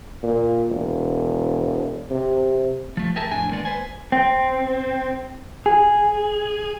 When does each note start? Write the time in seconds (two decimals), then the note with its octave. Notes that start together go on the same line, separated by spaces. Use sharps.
0.23 A#2
0.69 E1
2.10 C3
2.97 F3 A3
3.16 G4 G#4 A#4 E5 A5
3.31 F2 A2 D4 G#5
3.51 D#3 G#3 A#3 B3 D5
3.65 B4 C5 G#5
4.12 C4
5.66 G#4